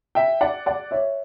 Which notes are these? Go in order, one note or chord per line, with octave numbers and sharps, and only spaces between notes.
E5 G5
D5 F#5
D5 F#5
C#5 E5